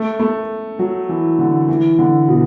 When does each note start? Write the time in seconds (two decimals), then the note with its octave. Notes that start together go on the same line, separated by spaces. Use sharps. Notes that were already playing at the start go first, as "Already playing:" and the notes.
Already playing: A3
0.20 A3
0.79 F#3
1.09 E3
1.39 D3
1.68 E3
1.99 D3
2.28 B2